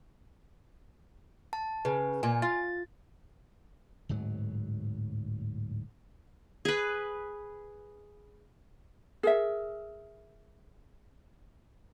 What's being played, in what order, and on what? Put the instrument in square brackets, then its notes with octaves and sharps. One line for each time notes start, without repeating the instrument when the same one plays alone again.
[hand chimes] A5
[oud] C#3 [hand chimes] B4
[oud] A#2 [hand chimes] G#5
[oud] F4 [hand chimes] A6
[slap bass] D1 G#2 F#3
[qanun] G#4 B4
[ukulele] G#4 A#4 E5